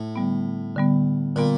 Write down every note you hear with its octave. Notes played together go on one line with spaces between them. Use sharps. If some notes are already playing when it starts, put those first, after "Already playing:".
Already playing: A2
D3 G3 B3
D3 G3 B3
A#2 D3 G3 B3